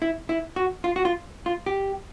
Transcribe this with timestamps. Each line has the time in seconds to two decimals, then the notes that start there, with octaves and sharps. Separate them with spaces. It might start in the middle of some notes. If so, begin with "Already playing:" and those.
0.02 E4
0.29 E4
0.56 F#4
0.84 F4
0.96 F#4
1.05 F4
1.46 F4
1.66 G4